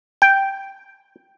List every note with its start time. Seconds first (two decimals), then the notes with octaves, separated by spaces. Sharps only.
0.22 G5